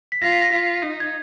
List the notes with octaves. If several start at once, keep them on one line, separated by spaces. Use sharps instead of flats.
B6
F4 A#6
B6
A#6
F4 B6
D#4
G#6